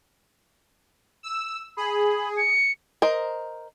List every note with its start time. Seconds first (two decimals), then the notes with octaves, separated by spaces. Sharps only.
1.23 E6
1.77 G#4 B5
2.37 C#7
3.02 A#4 C5 D#5